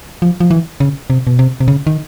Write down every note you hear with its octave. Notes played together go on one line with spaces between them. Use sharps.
F3
F3
E3
C#3
C3
B2
C3
C3
C#3
D#3